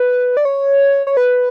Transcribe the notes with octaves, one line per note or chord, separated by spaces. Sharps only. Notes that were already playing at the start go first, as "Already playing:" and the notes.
Already playing: B4
D5
C#5
C#5
B4